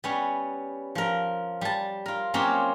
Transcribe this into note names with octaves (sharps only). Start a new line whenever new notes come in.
G3 B3 C#4
F3 A#4
G3 A5
F4 A#4
F#3 A#3 C4 C#4 F4 G4